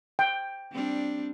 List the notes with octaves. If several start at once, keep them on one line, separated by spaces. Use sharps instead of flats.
G5
G3 C4 D4